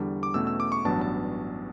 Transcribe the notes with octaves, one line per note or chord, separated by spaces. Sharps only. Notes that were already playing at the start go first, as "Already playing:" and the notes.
Already playing: E2 D3 G3 D4
D6
E2 B2 A3 C#4 E6
E6
D6
C#6
A1 G2 F#3 B3 D4 A5
A5